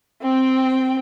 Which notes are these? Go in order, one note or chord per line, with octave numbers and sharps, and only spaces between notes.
C4 G5